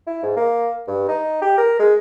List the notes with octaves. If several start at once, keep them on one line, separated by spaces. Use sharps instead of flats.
E4
G#2
A#3
G2
D#4
G4
A#4
G#3